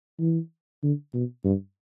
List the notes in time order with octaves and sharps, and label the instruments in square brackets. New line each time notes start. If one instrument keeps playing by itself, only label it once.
[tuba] E3
D3
B2
G2